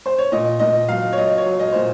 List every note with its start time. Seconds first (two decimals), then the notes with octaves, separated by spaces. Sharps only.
0.06 C5
0.18 C#5
0.32 A#2 D#5
0.59 A#2 D#5
0.88 F#3 F5
1.13 C#5
1.17 F#3 D#5
1.38 C#5
1.46 F#3
1.60 D#5
1.73 A#2 C5